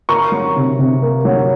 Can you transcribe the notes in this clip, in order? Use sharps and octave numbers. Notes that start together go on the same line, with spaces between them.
A#3 A#5 C#6
F#3
C3
C3
A#3
F#3